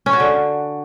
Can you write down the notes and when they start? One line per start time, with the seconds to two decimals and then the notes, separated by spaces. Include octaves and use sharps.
0.06 C#4
0.13 F#4
0.20 D3